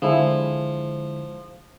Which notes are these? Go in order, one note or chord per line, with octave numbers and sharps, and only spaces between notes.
D3 F3 G#3 E4